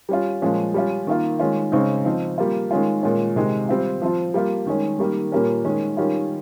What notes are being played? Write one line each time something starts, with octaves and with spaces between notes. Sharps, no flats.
G3 C#4 F4
A#2 F3 G#3 C#4
G3 C#4 F4
D#3 A#3 F4
D#3 G#3 C#4 F4
C#3 G#3 C4 D#4
F3 C4 D#4
G3 A#3 F4
D#3 G#3 C#4 F4
A#2 G#3 C#4
C3 D#3 G#3 D#4
G3 C4 F4
F3 C4 F4
G3 A#3 F4
D#3 G#3 C#4
D#3 G3 A#3
A#2 G3 A#3 C#4
D#3 G#3 C#4
D#3 G3 C#4 F4